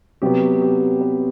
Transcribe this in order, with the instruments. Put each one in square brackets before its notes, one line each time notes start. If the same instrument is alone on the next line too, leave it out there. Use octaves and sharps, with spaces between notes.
[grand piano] C3 F#3 B3 G4
G4
B4